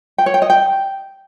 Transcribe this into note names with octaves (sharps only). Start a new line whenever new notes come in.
G5
C#5
G5
D#5
G5